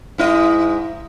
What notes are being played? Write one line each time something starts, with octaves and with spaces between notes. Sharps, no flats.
G#2 E4 D#5